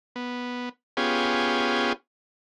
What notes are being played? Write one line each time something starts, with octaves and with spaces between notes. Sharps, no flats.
B3
B3 C#4 F4 G4 G#4